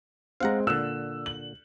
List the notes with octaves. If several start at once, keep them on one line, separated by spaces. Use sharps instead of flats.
G#3 C4 F5 F#5 A#5
A#2 D3 E6 F#6 E7
F#7